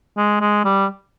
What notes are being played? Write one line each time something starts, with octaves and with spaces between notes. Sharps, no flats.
G#3
G#3
G3